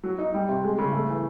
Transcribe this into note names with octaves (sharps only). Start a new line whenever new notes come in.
F#3
D#4
G3
C3
G#3
C#3
A3
E3